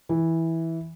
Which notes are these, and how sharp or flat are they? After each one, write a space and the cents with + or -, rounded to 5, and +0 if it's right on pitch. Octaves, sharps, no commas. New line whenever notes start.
E3 -10